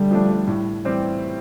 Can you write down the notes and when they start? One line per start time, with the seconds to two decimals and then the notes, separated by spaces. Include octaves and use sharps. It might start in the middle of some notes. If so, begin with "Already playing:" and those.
Already playing: D3 G3 A3
0.11 F3 A3 D4
0.47 A2
0.85 E3 G3 C4